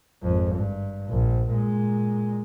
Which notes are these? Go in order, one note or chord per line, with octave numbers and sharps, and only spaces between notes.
G#1 F2
G2
A#1
A#2 G#3